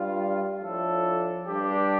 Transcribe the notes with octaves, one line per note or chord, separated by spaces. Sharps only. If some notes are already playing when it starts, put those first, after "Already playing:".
Already playing: G2 G3 F4
A2 F3 D4 A4
G2 G3 D4 G4